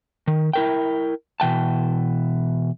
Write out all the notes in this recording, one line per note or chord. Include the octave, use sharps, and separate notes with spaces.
D#3
E4 A#4 G5
B2 E3 G5 A5